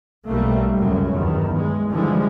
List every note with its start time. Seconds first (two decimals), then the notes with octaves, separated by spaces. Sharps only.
0.29 B1 G3 A3 A#3
0.76 C#2 F#2 C#3 F#3
1.12 E2 G2 D#3
1.52 G#3
1.90 D3 E3 F3 G3 G#3